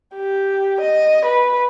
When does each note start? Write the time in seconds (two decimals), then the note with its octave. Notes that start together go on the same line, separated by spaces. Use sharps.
0.16 G4
0.81 D#5
1.26 B4